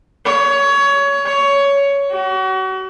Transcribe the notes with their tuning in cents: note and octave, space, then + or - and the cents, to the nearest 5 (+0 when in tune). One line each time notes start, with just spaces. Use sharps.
C#5 +20
C#5 +15
F#4 +35